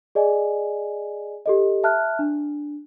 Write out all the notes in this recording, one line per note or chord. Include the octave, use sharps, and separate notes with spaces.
G#4 D5 D#5 G#5
G4 A4 D#5
E5 A5 F6 F#6
D4